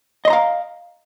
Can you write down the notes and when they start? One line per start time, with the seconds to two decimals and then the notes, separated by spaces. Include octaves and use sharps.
0.25 D#5
0.28 C6
0.30 A#5
0.33 F5